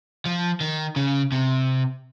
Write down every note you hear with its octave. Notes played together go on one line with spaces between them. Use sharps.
F3
D#3
C#3
C3